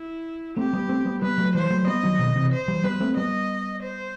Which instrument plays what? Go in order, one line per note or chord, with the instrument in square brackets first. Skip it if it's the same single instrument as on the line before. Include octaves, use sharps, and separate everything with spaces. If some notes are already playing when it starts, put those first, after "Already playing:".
Already playing: [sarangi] E4
[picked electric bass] A3 C4 [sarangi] G4
[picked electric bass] G3 B3
A3 C4
G3 B3
[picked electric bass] G3 B3 [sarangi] B4
[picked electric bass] F#3 A3
[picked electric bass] E3 G3 [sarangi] C5
[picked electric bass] F#3 A3
[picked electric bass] G3 B3 [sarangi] D#5
[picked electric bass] D#3 F#3
B2 D#3
C3 E3
[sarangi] C5
[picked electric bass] E3 G3
[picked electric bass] G3 B3 [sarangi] B4
[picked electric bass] A3 C4
[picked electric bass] G3 B3 [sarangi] D#5
[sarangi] C5